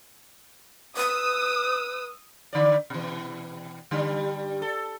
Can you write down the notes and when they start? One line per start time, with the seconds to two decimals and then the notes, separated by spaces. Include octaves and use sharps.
0.97 B4 D#6 E6
2.53 D3 D5
2.90 B2 E3
3.91 G2 D3 G3
4.62 A4